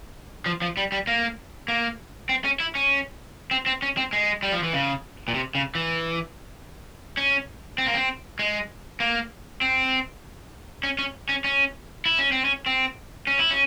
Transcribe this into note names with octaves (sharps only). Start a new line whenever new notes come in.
F3
F3
G3
G3
A#3
A#3
C4
C#4
E4
C#4
C4
C4
C#4
C4
G#3
G3
F3
E3
C#3
A#2
C3
C#3
E3
C#4
C4
A#3
C4
G#3
A#3
C4
C#4
C#4
C#4
C#4
E4
C#4
C4
C#4
C4
C#4
E4
C#4